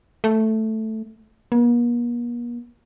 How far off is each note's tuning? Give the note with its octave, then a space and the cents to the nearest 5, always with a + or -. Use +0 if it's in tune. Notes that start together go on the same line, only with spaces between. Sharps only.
A3 +0
A#3 +45